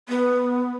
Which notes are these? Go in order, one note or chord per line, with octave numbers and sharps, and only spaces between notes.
B3